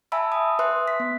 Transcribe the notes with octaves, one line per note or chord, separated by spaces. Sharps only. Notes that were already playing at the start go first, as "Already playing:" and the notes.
E5 G#5 A5 B5 E6
D#6
B4 E5 C6 D#6 F#6
B6
B3